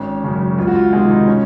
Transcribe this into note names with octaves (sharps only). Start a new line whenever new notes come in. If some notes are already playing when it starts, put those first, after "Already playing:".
Already playing: G#1 C#4
F#2 C#3
C#2 F4
F#4
F4
C3 D#3 G#3 F4
D#4
C#4